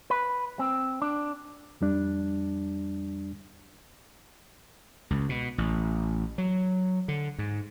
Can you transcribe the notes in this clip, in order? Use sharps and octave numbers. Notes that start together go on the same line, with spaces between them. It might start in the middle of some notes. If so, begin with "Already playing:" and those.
B4
C4
D4
F2 G3 D4
C#2
B2
A1
F#3
D3
G#2